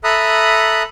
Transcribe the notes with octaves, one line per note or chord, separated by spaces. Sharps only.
A4 E5 A#5 B5 D#6 F#6